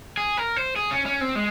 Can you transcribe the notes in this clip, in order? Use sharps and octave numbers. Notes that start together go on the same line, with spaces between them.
G#4
A#4
C5
G#4
C#4
C#4
C4
G#3